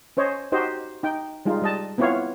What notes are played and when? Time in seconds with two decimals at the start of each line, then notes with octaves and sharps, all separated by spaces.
0.17 C#4 C5 C#5 D#5
0.52 D#4 F#4 G4 C5 D#5
1.03 D#4 G5
1.45 G3 G#3 D#4 F4
1.62 G3 D#5 A5
1.98 B3 C4 E4 F4 C#5 F5